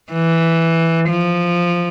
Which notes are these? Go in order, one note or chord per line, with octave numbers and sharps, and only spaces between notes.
E3
F3